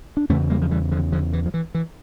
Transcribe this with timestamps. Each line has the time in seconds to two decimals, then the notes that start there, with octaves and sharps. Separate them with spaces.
0.17 D4
0.29 E2 C#3 A3 C#4
0.50 G3 A#3
0.62 F3
0.71 E3 G3
0.92 D3 F3
1.12 D3 F3
1.33 E3
1.46 F3
1.54 E3
1.75 E3